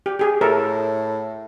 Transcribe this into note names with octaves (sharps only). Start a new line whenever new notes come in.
G4
G4 G#4
A2 A4 A#4